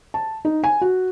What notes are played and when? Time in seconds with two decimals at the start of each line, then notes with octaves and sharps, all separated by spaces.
0.14 A5
0.45 D#4
0.64 G#5
0.81 F#4